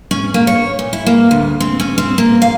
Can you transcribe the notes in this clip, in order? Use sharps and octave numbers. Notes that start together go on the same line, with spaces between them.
C#4
A#3
C#5
A#2
E4
A#3
D2
C4
C#4
C4
A#3
F5